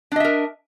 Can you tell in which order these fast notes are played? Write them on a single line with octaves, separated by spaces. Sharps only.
D4 D#5 E5 A#4